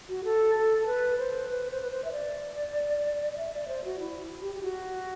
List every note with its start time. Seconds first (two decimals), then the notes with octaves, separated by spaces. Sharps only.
0.09 F#4
0.24 A4
0.55 A4
0.86 B4
1.18 C5
1.49 B4
1.71 C5
1.81 B4
1.90 C5
2.04 E5
2.12 D5
3.33 D5
3.37 E5
3.53 D5
3.68 C5
3.84 F#4
4.00 E4
4.42 G4
4.55 G4
4.62 F#4